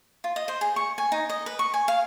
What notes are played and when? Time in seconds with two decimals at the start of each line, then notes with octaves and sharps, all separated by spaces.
0.24 F4
0.36 D#5
0.48 C5
0.61 G#4
0.76 C#6
0.98 G#5
1.12 D#4
1.29 D#5
1.46 B4
1.59 C#6
1.74 G#5
1.88 F5